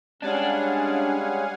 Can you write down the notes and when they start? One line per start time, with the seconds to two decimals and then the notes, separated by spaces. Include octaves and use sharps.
0.22 G3 G#3 C#4 D4 F5 F#5 G#5